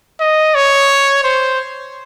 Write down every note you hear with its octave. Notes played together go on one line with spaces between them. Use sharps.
D#5
C#5
C5